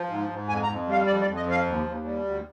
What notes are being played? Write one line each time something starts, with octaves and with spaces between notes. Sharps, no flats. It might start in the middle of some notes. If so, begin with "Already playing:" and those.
Already playing: F3
G#2
G#2
F2 G#5
A#5
F2
G3 F5
F2 D5
D5
F2
D#5
F3 F5
D#2
D#2
G3
D2